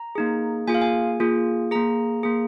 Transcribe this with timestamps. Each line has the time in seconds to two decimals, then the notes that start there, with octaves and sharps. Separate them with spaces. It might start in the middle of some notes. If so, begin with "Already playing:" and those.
Already playing: A#5
0.15 A#3 D#4 G#4
0.67 A#3 F4 G#4 G#5
0.74 F5
0.81 G#5
1.20 A#3 F4 G#4
1.71 A#3 G#4 A#5
2.23 A#3 G#4